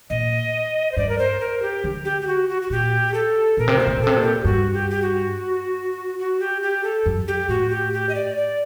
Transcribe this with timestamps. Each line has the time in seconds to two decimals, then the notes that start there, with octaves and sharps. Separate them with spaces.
0.10 A#2 D#5
0.92 C5
0.97 G2 D5
1.09 A#4
1.18 C5
1.41 A#4
1.62 G4
1.84 D3
2.05 G4
2.22 G4
2.27 F#4
2.49 F#4
2.62 F#4
2.70 A#2 G4
3.14 A4
3.57 A#2 A#4
3.68 C3
3.77 A#2 C5
3.87 C3
3.97 A#2
4.02 C3 A4
4.16 A#2
4.24 G4
4.44 G2 F#4
4.74 G4
4.90 G4
5.02 F#4
6.19 F#4
6.40 G4
6.62 G4
6.84 A4
7.06 F#2
7.28 G4
7.49 A2 F#4
7.70 G4
7.93 G4
8.09 D#5
8.15 D5
8.37 D5